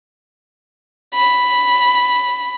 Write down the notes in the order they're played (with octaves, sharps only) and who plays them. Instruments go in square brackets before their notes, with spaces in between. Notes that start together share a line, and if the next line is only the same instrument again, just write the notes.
[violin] B5